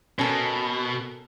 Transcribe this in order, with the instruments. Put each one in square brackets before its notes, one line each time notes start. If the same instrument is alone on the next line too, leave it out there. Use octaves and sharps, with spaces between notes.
[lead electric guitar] B2 [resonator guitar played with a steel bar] C#4 A4 A#4